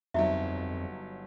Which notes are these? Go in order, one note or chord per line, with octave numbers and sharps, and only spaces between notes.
G1 F2 F#3 D#4 E4 F#4 E5